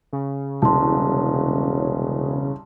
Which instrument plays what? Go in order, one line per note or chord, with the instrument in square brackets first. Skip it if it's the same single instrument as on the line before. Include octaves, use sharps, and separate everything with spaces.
[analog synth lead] C#3
[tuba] E1 [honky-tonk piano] C2 [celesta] A5 C6